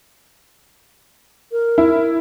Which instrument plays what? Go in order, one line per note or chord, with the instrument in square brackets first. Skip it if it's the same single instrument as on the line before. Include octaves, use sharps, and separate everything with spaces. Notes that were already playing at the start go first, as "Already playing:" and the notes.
[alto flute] A#4
[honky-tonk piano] E4